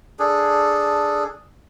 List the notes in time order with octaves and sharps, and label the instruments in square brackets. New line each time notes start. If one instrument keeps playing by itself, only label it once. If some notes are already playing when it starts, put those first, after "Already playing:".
[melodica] D4 G#4 A4